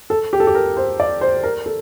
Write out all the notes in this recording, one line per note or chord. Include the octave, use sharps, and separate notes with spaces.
A4
G4
A4
G4
A#4
C5
D5
C5
A#4
A4